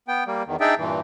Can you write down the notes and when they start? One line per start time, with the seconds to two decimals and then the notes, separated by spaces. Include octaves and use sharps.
0.08 B3 G5
0.27 G3 A#3
0.47 E2 D#3
0.60 D4 D#4 G#4 D5 E5 G5
0.78 G2 A#2 E3